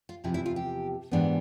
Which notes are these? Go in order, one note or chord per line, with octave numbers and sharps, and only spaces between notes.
F4
E2 C3 F3 E4
E4
F4
G4
G#2 E3 G3 B3 D4